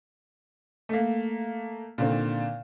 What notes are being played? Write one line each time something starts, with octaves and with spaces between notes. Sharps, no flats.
A3 A#3
A#2 D3 D#3 C4